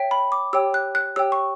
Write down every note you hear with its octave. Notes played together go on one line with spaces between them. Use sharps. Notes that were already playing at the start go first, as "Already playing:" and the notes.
Already playing: C#5 E5 G5
B5
D6
G4 C#5 G5 E6
F#6
F#6
G4 C#5 G5 E6
C#6